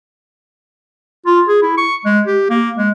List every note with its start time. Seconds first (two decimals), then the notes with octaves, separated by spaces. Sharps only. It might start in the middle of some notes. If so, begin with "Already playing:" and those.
1.26 F4
1.48 G#4
1.62 E4
1.77 C#6
2.06 G#3
2.27 G4
2.50 A#3
2.77 G#3